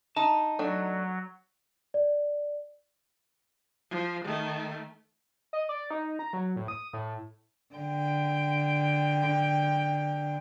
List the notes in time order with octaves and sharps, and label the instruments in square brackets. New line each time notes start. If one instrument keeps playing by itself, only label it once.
[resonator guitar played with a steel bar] D#4 [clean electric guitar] A5
[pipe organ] F#3 [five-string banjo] A3 D4
[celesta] D5
[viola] F3
D#3 A3
[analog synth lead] D#5
D5
D#4
A#5
F#3
A2
D#6
A2
[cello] D3 G5